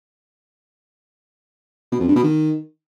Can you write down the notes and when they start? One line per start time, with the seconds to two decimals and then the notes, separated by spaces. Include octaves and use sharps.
1.92 B2
2.00 F2
2.08 G2
2.16 B2
2.24 D#3